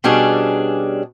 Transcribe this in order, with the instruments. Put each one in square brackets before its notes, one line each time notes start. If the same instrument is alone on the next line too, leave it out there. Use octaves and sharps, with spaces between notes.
[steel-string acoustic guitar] B2 G3 C#4 D4 G#4